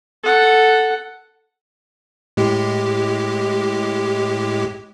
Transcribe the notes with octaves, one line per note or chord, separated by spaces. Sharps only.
A4 F#5
A2 G#3 G4